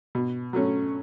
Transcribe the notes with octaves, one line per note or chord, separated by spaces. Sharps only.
B2
F#3 A3 C#4